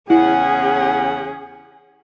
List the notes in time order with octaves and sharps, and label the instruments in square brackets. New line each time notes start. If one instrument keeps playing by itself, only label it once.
[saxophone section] E2 C#3 F#5 [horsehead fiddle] C#4 G#4 [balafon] E4